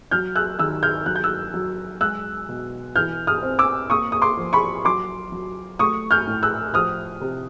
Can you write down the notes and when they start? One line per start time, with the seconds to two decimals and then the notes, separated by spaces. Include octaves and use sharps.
0.11 F#3 F6 G6
0.36 E6 F#6
0.59 D#3 E6 F#6
0.83 F6 G6
1.06 F#3 F#6
1.16 G6
1.24 E6 F#6
1.54 F#3
2.01 G#3 E6 F#6
2.49 B2
2.96 E3 F6 G6
3.27 D#6 F6
3.43 C4
3.59 D6 E6
3.90 A#3 C#6 D#6
4.12 D#6
4.22 C6 D6
4.37 F3
4.53 B5 C#6
4.85 F#3 C6 D6
5.32 F#3
5.79 A3 C#6 D#6
6.11 F6 G6
6.27 A2
6.43 E6 F#6
6.74 F3 D#6 F6
7.21 C3